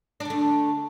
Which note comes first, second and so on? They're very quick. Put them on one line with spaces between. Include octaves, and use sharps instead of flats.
D4 D3 A3